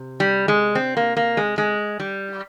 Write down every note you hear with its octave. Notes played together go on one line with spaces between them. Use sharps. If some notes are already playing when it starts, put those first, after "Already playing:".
Already playing: C3
G3
G#3
C4
A#3
A#3
G#3
G#3
G3